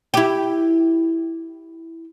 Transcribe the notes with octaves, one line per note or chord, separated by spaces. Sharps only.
E4 G4